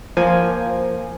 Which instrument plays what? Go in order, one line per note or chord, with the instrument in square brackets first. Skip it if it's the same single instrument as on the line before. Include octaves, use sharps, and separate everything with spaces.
[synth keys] F3 A#3 G#5